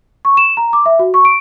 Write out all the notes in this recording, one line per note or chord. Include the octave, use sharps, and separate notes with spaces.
C#6
E7
A#5
D6
E5
F#4
C#6
D7